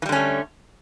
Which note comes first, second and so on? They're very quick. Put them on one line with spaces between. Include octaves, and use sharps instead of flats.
E3 G3 D3 C#4 A3